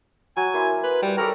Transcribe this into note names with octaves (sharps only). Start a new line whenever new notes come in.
F#3 G#5
A#3 E4 C5
B4
G3
G4 A4 A#4 C#5